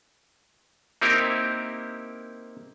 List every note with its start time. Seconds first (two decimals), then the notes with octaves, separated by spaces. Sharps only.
1.01 A#3 C4 D#4 E4 G4 A#4